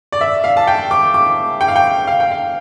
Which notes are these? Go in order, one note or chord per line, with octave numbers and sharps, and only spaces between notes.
D5
E5
F5
A5
G5
D6
D6
G5
F5
G5
F5
G5
F5